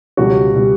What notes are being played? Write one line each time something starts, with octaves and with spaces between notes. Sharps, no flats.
C#2 B2 G3 F#4
B2 G3